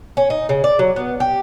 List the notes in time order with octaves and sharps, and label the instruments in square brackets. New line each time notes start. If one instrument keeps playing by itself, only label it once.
[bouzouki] C#4
D#4
C#3
D5
F#3
B3
G4